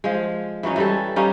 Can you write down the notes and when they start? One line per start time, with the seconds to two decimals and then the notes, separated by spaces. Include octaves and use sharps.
0.04 F3 G#3
0.63 E3 F#3 C#4 D#4
0.76 E3 G3 A4
1.16 G3 A#3 C#4 D#4